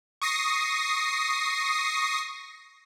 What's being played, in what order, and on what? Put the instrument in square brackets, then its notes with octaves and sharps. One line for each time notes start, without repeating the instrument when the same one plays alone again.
[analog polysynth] C#6 D#6 A#6 C7